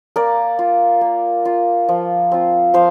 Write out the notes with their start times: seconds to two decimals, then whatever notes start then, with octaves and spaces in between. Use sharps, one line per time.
0.16 A#3 A#4 D5
0.59 F4
1.01 A#3
1.45 F4
1.89 F3
2.32 C4 F4
2.74 F3 C5 F5